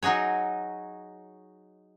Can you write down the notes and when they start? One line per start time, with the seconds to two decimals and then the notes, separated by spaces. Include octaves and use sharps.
0.03 F#3 D#4 F#4 G#4 C#5